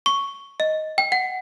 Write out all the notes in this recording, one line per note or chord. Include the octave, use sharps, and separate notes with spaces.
C#6
D#5
G5
F#5